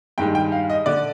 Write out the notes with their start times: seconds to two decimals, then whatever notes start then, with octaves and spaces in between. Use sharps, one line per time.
0.18 G2 D#3 G#3 G5
0.35 G5
0.52 F5
0.70 D#5
0.86 D3 D5